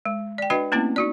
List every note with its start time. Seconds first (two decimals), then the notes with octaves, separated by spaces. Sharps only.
0.05 G#3
0.38 D5 G5
0.50 D4 F#4 B4 D#5 G5
0.72 A3 A#3 C4 C#4 E4
0.96 D#4 F#4 D5